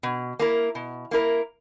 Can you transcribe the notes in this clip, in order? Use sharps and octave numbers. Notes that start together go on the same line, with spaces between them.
B2
A#3 E4 A#4
B2
A#3 E4 A#4